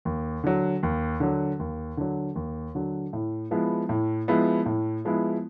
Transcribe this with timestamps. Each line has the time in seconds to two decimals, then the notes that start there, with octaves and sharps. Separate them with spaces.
0.05 D#2
0.44 D3 F#3
0.83 D#2
1.20 D3 F#3
1.59 D#2
1.97 D3 F#3
2.35 D#2
2.75 D3 F#3
3.13 A2
3.51 F3 G#3 B3 E4
3.89 A2
4.28 F3 G#3 B3 E4
4.66 A2
5.05 F3 G#3 B3 E4